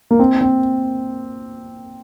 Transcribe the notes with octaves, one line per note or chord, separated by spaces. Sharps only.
A#3
C4
C4